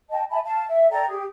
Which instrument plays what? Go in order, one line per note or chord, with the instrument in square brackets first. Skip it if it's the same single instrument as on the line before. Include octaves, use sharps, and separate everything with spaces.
[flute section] D#5 G5 A5
E5 G#5 A5 B5
F5 A5
E5
A4 D5 G5 A#5
G4 G#4